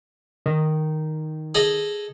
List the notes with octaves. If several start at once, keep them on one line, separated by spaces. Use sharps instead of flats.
D#3
G#4 A4 D#5